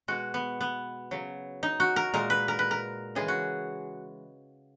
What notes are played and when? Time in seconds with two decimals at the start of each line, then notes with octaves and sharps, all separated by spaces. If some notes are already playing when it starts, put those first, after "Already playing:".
0.08 B2 G#3 F#4
0.34 B3
0.61 B3
1.11 C#3 F#3
1.63 D#4
1.80 F#4
1.96 A#4
2.14 A#2 G#3 A#4
2.30 B4
2.48 A#4
2.59 B4
2.71 A#4
3.15 C#3 E3 G#3 G#4
3.28 F#4